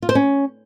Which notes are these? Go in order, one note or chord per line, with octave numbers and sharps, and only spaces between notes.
F4
C5
C#4